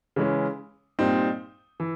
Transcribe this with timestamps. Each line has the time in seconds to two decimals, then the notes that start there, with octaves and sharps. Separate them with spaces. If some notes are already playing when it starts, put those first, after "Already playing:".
0.16 C#3 E3 G#3 C#4
0.99 A#2 G3 C4 D#4
1.80 E3